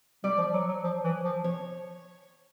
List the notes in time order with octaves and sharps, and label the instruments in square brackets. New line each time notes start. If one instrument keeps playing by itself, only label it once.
[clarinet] G3 [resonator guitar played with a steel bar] D5
[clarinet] F3
F#3
F#3
F3
E3
F3
[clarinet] F3 [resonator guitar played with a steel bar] C#5